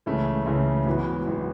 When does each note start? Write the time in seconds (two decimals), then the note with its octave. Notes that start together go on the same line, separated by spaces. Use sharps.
0.06 C#2 C#3 E3 A3
0.46 C#2 C#3 E3 A3
0.86 G#1 F#2 E3 B3 F#4
1.26 G#1 F#2 E3 B3 F#4